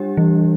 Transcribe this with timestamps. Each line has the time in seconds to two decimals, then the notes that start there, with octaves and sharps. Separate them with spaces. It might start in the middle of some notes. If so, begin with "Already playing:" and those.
Already playing: G3 D4 G4
0.17 E3